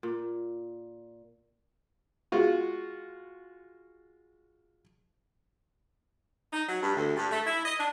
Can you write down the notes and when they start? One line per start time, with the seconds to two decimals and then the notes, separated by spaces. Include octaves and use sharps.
0.03 A#2
2.32 G#3 F4 F#4
6.53 D#4
6.68 F#3
6.83 G2
6.96 D2
7.16 G2
7.31 A3
7.47 E4
7.65 D#5
7.79 D4